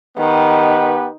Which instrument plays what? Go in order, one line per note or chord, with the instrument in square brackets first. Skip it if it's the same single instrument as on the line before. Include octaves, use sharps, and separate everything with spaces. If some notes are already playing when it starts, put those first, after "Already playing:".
[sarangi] D#3 [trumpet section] B3 G4 B4